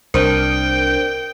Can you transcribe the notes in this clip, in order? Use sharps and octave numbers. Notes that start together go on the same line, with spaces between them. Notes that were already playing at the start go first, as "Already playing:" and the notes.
C2 D4 A#4 C5 G5